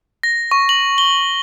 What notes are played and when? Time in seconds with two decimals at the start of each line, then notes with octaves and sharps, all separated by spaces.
0.23 A#6
0.51 C#6
0.69 F#7
0.98 G7